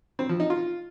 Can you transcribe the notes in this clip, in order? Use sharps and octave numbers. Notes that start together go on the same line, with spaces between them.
C4
F3
D#4
F4